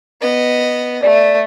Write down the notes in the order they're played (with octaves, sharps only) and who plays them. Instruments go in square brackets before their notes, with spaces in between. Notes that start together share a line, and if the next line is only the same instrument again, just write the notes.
[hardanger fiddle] B3 D#5
[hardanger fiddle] A3 [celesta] D5